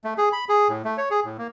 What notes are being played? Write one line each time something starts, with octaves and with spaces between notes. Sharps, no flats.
A3
G#4
B5
G#4
A2
A3
C#5
G#4
A2
A#3